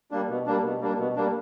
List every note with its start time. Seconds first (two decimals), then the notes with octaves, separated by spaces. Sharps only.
0.11 G3 A#3 D4
0.29 B2
0.46 G3 A#3 D4
0.64 B2
0.81 G3 A#3 D4
0.98 B2
1.16 G3 A#3 D4